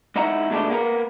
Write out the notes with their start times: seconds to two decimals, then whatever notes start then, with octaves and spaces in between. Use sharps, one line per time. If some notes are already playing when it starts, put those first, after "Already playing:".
0.16 G#2 D#4 E4 F#5 A#5
0.50 B2 G#3 A3 D4 G4
0.70 A#3 B3 G#4 A#4